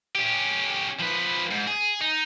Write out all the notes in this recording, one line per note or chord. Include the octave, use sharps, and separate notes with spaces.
C#4 G4
F3 B4
G#2
G#4
D#4